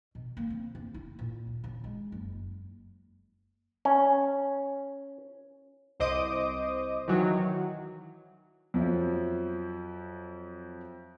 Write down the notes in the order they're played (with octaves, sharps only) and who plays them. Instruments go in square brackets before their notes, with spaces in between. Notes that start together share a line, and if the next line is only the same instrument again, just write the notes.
[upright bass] B2
A#3
C4
C3
E4
A#2
D2
C#3
G#3
F#1
[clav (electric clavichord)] C#4
[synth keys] C2 C5 D#5 D6 D#6
D#3 E3 F#3
[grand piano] F2 F3 F#3 E5